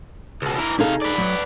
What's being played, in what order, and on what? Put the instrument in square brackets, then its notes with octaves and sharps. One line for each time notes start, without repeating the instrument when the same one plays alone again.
[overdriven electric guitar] C#2 B2
E3 A#4
[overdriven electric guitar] C3 F5 [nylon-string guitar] D#4 G#4 A4
[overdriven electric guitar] B4 D5
[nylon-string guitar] F#3